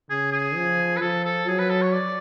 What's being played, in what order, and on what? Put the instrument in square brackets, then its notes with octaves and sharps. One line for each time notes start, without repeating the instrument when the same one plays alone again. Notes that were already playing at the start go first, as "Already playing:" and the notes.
[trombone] C#3 [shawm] G#4
[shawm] G#4
[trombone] F3
[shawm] B4
[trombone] F3 [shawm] A4
[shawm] A4
[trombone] F#3 [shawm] G#4
[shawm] B4
A4
C#5
D5